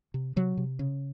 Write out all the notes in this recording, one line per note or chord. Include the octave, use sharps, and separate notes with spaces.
C3
C3 F#3
C3
C#3